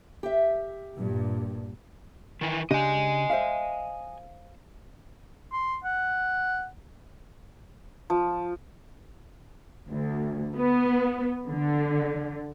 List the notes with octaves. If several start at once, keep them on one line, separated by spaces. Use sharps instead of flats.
G4 E5
G2 A#2
D#3 E3
C#3 D4 G4 D#5 G#5
C5 E5 F5
C6
F#5
F3
D2
B3
D3